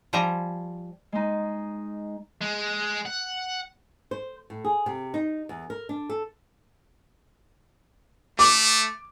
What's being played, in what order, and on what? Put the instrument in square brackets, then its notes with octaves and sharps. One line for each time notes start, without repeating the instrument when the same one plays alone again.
[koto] F3 G3 C5 G#5 A#5
[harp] G#3 D#4
[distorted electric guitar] G#3
F#5
[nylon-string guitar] C5
A2
G#4
C3
D#4
E2
A#4
D4
A4
[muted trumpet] A3 [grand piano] D6